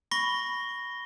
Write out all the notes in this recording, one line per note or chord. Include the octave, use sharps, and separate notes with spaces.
B5 C#6 A#6 G7